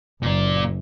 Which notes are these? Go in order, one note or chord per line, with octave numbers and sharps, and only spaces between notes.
F#1 A#2 D5